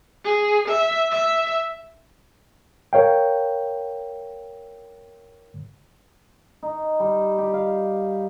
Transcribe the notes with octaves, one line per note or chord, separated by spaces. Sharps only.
G#4
E5
E5
A#4 C#5 F5 G5
D#4
G3
G4
F5